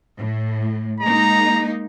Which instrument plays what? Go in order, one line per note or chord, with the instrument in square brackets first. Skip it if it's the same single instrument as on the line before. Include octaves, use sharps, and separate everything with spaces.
[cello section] A2
[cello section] G#3 A#3 D#4 [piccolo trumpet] A#5